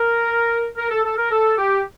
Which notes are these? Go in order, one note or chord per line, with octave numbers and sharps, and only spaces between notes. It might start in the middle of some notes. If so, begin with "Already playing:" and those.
Already playing: A#4
A#4
A4
A4
A#4
A4
G4